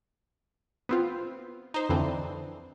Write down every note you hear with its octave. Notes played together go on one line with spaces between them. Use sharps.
B3 C4 F4
D#4 C5
F2 D3 E3 C4 D4